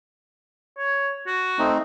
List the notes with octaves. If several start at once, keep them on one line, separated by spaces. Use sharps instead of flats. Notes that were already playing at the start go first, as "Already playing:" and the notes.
C#5
F#4
A3 C4 D#4